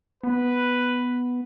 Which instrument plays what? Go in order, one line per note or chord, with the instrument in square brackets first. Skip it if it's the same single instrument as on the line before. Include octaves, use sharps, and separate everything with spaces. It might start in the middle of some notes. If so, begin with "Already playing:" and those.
[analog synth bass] B3 [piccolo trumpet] B4